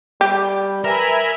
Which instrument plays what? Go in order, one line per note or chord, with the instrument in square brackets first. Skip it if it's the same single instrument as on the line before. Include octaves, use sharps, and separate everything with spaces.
[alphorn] G3 [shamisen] G4
[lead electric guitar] A#4 [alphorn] B4 [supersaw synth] E5 G#5 B5